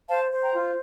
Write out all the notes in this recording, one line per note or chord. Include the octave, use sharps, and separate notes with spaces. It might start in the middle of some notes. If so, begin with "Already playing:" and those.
C5 F5 A5
C5
G5 A#5
F4